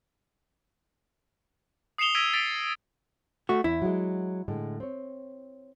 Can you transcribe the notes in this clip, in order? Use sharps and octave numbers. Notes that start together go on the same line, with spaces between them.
D#6 C7 C#7 E7 F7 G7
E6 G#6 A#6 B6 D7 D#7
A6 B6 D7 F7
A3 F#4
E2 E4
F#3 G#3
A2 D3 G#3
C4 C#5